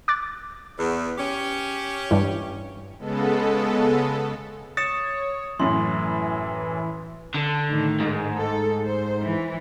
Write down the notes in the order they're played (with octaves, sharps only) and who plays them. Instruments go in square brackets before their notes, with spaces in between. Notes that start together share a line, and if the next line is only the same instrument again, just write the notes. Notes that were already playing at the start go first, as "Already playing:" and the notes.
[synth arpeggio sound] D6 F#6 A6
[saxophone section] E2
C#4 G4
[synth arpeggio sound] G2 E3
[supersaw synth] C#3 G#3 B3 A4
[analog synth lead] C#5 [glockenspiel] D#6 C#7 E7 [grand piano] A6
[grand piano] F#2 A2 [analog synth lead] E3 [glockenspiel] C6
[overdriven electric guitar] D3
[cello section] A2 D#3
[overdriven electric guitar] G#2
[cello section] A4
C5
E3